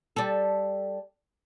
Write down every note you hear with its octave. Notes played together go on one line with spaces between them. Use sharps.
G3 A4